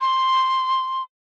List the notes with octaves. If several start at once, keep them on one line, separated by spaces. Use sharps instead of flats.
C6